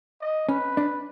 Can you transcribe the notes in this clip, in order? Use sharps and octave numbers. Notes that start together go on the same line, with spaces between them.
D#5
C#4 B4
D4